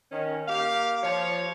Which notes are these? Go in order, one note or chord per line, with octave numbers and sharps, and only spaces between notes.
D#3 C#4
A#3 G4 F5
F3 C#5